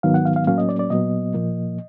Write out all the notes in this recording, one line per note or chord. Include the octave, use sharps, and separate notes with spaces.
G#2 D#3 F#3 B3 F5
F#5
F5
F5
A2 F#3 A#3 C#4 F5
D#5
D5
D5
A#2 F#3 B3 D#5
A#2 F3 A#3